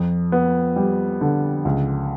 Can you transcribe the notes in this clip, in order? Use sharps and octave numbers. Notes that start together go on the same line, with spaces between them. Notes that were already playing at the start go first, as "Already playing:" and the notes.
Already playing: F2
B3
G3
D3
C#2